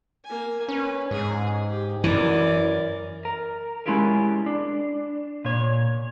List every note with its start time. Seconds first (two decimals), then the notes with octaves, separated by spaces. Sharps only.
0.25 A#3 G#5
0.69 C#4 B4
1.11 G#2 G#4
1.69 G4
2.04 F#2 E3 A#4 D5
3.25 A#4
3.86 G#3 C#4 E4 F4 G4 A#4
4.46 D4
5.45 A#2 C#5